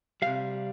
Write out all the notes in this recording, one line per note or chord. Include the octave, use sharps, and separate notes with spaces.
C3 G3 F5